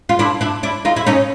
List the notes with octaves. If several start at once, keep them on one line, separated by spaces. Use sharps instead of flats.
F4
D4 E4
D4 E4
D4 E4
D#4 F4
E4
C#4 D#4